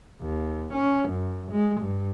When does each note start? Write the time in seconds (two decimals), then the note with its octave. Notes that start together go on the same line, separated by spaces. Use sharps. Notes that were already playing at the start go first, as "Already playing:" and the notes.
0.22 D#2
0.73 C#4
1.09 F#2
1.52 G#3
1.81 G2